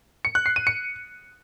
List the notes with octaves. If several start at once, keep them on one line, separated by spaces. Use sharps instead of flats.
C#7
F#6
C7
D#7
C#7